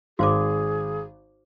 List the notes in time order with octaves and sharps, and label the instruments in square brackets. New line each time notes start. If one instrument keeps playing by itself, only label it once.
[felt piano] G#1 [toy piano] F#4 C5 D6 [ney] G#4